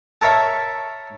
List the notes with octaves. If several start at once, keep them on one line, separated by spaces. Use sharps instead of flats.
A4 A#4 C#5 E5 B5